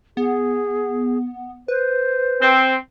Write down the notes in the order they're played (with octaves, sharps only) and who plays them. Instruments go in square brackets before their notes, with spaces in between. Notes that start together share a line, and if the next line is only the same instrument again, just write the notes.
[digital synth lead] B3 [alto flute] G#4
[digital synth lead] B4 [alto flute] C5
[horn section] C4